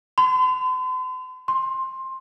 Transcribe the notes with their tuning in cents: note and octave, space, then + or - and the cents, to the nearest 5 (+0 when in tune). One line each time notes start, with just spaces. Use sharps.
C6 -45
C6 +15